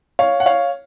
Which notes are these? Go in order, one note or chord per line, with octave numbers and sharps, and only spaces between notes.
C#5 F5
F#5
C#5 F5